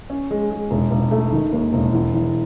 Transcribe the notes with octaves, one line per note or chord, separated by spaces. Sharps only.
C#4
G#3
G#3
E1
E1
A3
D#3
D#2
E1
E2
E2